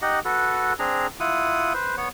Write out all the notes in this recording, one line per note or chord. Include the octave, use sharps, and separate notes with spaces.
D#4 G4 D#5 F#5
F#4 A4 B4
C4 D4 G#4 A#5
E4 F4 F#5 D#6
B4 C5
B3 C#5